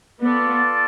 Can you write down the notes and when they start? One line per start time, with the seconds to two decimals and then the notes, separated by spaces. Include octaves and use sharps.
0.20 B3 F4 A4 D5